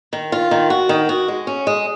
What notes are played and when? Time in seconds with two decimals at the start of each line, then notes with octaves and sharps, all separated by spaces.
0.13 D#3
0.32 F4
0.51 D#3
0.70 F#4
0.89 D#3
1.09 F#4
1.28 G#3
1.47 C#4
1.67 G#3